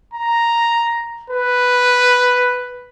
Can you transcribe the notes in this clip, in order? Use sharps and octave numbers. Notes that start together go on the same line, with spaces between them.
A#5
B4